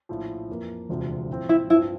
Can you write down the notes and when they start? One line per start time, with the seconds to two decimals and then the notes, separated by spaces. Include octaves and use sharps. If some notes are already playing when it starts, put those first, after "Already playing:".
0.09 A#1 A2 F3
0.49 F2 E3 A#3
0.89 E1 D2 C3 F3
1.29 A#1 A2 F3 C4
1.49 E4
1.70 G2 F3 C4 E4 F4